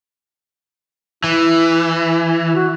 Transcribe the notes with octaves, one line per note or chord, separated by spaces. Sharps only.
E3 E4
F#4